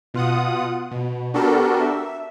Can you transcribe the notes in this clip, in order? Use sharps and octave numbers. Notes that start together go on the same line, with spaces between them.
B2 F4 F#5 D#6
B2
B3 D4 F#4 G4 A4 A#4
E5